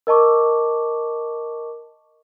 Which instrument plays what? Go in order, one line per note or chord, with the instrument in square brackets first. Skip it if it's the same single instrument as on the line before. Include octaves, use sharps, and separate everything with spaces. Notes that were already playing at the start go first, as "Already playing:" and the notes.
[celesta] A#4 D#5 A5 C#6 D6